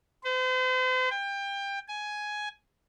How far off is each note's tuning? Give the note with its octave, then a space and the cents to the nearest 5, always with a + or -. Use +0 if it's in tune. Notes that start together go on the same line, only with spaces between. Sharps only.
C5 -40
G5 +25
G#5 +10